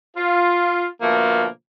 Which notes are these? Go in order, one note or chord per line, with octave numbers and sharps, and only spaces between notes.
F4
B2 D3 F3 A3 A#3